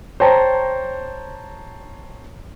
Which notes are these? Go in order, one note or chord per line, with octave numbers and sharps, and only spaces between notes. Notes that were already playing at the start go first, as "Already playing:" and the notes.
C5 C#5 G5 A5 A#5